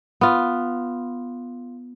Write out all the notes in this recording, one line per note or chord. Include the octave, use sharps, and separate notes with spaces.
B3 F4